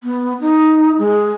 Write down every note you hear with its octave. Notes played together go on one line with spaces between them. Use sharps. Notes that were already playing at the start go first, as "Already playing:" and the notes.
B3
D#4
G#3